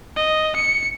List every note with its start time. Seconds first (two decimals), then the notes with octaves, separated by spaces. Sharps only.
0.16 D#5
0.56 C#7